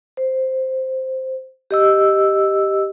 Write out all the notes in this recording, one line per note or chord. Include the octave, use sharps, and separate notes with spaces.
C5
G4 D#5 E6